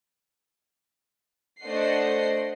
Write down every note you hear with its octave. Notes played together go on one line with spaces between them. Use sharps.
A3 D4 C5 D#5 F#5 C7